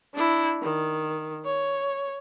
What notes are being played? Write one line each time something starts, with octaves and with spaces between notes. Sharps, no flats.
D4 E4
D#3
C#5